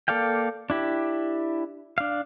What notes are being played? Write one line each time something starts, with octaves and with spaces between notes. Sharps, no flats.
A#3 A4 D5 F5 G5
D4 E4 G4
D4 F5